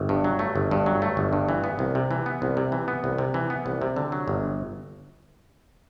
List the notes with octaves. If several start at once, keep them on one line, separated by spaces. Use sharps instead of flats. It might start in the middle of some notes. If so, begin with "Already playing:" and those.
Already playing: G1
G2
F#3
A3
G1
G2
F#3
A3
G1
G2
E3
B3
C2
C3
E3
B3
C2
C3
E3
B3
C2
C3
E3
B3
C2
C3
D3
F#3
G1